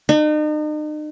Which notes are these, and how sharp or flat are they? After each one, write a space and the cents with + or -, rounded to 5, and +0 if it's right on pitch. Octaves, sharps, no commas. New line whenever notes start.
D#4 -40